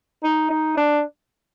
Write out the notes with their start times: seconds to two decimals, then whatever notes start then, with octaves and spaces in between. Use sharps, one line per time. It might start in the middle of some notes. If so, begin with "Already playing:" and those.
0.23 D#4
0.50 D#4
0.77 D4